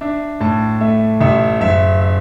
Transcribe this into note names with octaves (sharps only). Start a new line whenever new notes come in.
D4 E5
A2 A5
A3 E5
A1 E5
F#1 E5
E5